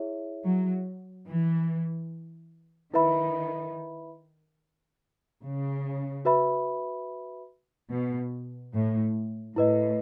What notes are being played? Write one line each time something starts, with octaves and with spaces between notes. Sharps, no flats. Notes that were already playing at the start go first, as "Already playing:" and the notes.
Already playing: E4 G#4 C#5 E5
F#3
E3
D#3 E4 B4 E5 B5
C#3
F#4 B4 E5 B5
B2
A2
A2 E4 B4 D#5